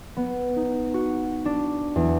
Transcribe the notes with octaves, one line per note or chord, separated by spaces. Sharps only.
B3
D#4
F#4
D4
E2